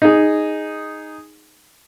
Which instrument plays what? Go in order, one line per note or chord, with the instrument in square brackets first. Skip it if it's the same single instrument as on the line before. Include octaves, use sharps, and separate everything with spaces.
[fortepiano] D#4 G#4